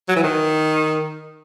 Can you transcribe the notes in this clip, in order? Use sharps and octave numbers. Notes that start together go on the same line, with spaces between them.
F#3
E3
D#3